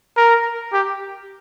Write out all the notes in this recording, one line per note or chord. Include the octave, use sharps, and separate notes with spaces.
A#4
G4